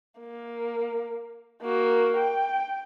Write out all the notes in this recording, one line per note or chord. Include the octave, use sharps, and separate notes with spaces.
A#3
A#3 F#4
G5